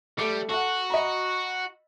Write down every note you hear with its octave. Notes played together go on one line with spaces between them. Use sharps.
G3 A3 D6 C#7
F#4 A4 F#5
D#5 A#5 B5